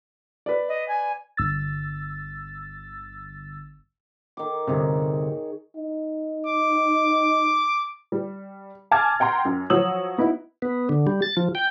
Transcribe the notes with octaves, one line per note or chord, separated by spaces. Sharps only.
B4 D5
D#5
G#5
G1 E6 A6
D#3 D6
G1 C3 D#4 G#4 C#5
D#4
D6
G3
G#5 A5 D6 F6 G#6 A6
F#5 G5 A#5 C6
F#2
F3 F#3 C#5 D#6 E6 F#7
B3 D#4 E4
B3
D3
G3
A6
F3
G5